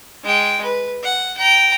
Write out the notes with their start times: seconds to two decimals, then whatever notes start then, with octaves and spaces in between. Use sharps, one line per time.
0.24 G#3 G5
0.64 B4
1.04 F#5
1.37 G5 A#5